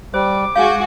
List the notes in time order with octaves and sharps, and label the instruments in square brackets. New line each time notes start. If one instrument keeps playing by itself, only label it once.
[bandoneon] G3 [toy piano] C5 [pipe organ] D6
[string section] G#3 F#4 G#4 [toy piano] F5 G#5 [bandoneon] G6